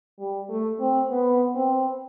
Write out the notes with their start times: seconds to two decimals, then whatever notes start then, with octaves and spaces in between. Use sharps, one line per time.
0.19 G3
0.49 A3
0.80 C4
1.10 B3
1.55 C4